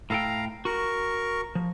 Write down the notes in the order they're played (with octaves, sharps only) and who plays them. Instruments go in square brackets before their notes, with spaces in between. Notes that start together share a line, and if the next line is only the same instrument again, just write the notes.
[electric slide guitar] A2 A4 G5 [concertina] F5 A#5
[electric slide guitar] F#4 [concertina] A#4 C#6
[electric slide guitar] F3